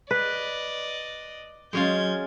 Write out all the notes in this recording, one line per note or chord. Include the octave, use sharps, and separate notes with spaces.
B4 D5 D#5
F#3 G#3 C#4 F4 G6 G#6